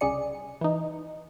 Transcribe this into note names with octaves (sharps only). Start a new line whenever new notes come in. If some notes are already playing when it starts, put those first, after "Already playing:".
C2 C#3 G#4 D5 C#7
E3 D#4